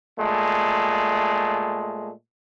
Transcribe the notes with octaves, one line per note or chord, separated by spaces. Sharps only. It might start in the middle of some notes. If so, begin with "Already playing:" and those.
A#2 G#3 A3